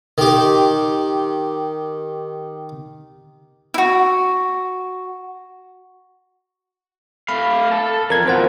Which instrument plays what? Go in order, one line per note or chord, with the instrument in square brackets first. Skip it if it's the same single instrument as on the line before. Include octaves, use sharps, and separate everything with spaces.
[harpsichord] D#3 G4
[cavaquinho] E4 F#4
[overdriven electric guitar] A3 F5 [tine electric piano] B5
[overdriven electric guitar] A4 A5
[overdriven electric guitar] F2 [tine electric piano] A#4 G#6
[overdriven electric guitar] F2 B2 [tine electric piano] F4 C5 F#5